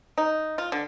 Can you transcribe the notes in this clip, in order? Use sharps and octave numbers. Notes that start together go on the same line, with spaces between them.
D#4
F4
D3